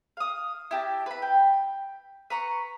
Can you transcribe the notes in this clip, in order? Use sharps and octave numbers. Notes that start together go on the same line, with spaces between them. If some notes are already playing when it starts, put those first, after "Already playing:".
F5 D#6
E4 G4 A5
B4 B5
G5
B4 A#5 C#6